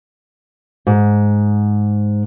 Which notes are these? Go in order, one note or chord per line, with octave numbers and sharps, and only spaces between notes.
G#2